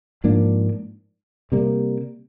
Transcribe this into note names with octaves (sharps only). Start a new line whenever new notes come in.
G#2 F3 A#3 D4
C3 G3 A#3